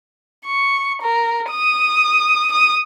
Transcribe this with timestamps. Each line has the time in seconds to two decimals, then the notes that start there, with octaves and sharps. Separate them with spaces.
0.46 C#6
1.02 A#4
1.50 D#6
2.52 D#6